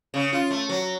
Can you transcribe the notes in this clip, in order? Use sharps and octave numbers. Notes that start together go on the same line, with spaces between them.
C#3
F4
A3
F#3